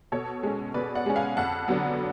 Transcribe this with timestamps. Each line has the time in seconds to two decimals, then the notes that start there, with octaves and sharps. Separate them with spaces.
0.12 B2 A4 C#5
0.43 G#3 C#4
0.74 B2 B4 D5
0.95 D5 F#5
1.06 G#3 C#4
1.16 F5 G#5
1.37 F2 F#5 A5
1.68 D3 F#3 B3